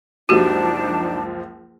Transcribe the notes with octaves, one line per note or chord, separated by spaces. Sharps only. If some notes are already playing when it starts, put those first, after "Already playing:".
F#1 C#2 F3 D4 D#4 F#4 G4 A5